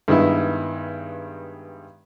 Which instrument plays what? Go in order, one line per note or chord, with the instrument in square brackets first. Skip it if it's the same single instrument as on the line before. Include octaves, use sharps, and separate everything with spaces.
[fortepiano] G2 D#3 G#3 B3 E4